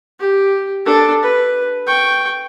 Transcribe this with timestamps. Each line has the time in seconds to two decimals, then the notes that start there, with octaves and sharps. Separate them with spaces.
0.20 G4
0.85 D4 A4
1.22 B4
1.87 G5 C#6